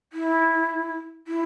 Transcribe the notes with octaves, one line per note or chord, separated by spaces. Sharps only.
E4
E4